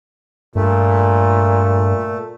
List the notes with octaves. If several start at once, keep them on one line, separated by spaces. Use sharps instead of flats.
G2 A#2 A3